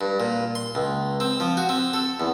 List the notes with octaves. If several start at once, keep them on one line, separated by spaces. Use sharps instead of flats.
G2
A#2
C6
C#2
C4
F3
F#4
C4
A4
E2